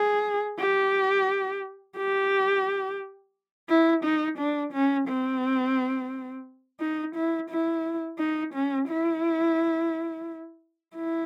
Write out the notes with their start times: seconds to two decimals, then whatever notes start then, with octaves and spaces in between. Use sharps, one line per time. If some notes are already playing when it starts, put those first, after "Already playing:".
Already playing: G#4
0.59 G4
1.97 G4
3.69 E4
4.04 D#4
4.39 D4
4.73 C#4
5.08 C4
6.80 D#4
7.15 E4
7.50 E4
8.19 D#4
8.54 C#4
8.89 E4
10.96 E4